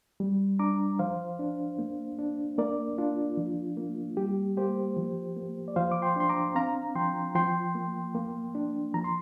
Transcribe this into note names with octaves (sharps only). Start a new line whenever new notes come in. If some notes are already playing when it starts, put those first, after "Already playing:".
G3
D4 A#5 D6
F3 C5 F5
D4
A#3
D4
A#3 A#4 D5
D4 F4
F3
A#3
G3 G4
A#3 G4 C5
F3
A#3
D5
F3 C5 F5
D6
G5 C6
D4 C6
A#5 D6
C4 F5 A#5
F3 G5 C6
F3 G5 C6
A#3
A#3
D4
F3 A#5
C6